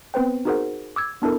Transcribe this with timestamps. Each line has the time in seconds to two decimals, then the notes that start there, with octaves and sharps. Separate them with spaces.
0.14 B3 C4 B4 C5 G5
0.45 D#4 F#4 G#4 A#4 C5 F#5
0.96 D6 E6 G#6
1.22 B3 D4 E4 A4 A#4